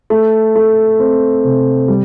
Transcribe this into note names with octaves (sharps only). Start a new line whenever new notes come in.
A3
A3
C4
C3
G3